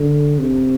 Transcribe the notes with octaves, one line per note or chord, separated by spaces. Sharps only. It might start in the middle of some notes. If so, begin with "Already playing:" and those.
Already playing: D3
C3